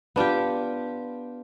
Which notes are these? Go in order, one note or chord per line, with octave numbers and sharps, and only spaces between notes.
B3 D4 F4 G4